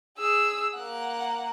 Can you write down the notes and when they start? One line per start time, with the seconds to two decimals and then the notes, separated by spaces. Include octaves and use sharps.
0.18 G#4 E6
0.75 A#3 F#5